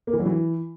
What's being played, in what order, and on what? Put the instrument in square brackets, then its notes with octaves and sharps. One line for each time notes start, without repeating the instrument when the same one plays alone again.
[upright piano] A#3
E3
F#3
E3